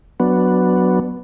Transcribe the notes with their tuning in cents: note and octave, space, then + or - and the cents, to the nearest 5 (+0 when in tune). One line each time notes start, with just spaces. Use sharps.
F#3 +0 B3 +0 D4 +0